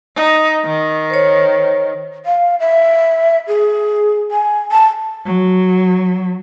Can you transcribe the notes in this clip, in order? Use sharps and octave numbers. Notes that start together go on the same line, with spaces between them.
D#4
D#3
C5 C#5
F5
E5
G#4
G#5
A5
F#3